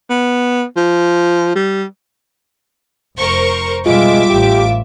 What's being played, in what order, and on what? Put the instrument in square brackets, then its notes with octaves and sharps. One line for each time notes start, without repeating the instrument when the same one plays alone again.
[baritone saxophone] B3
F3
G3
[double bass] F1 [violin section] A#4 C5 C#6
[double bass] B2 G3 [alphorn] G#3 [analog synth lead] F4 [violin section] E5 D6
[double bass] A1 [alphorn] G4